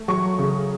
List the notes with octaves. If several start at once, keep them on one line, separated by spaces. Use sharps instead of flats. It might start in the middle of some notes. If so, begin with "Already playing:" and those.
Already playing: A3
F#3 C#6
C#3